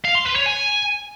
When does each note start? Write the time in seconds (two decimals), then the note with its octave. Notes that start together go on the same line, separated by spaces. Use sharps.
0.05 F5
0.15 C6
0.26 B4
0.36 C#5
0.46 G#5